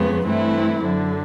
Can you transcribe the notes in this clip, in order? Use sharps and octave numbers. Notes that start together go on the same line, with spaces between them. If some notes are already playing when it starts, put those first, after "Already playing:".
Already playing: F2 C#3 G#3 B3
G2 E3 A3 C4 E4
F#2 D3 F#3